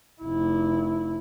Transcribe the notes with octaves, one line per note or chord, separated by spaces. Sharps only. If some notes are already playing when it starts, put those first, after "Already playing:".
F1 E4